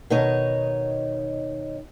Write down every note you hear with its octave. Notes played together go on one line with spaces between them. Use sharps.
B2 D#3 D#4 C#5 D#5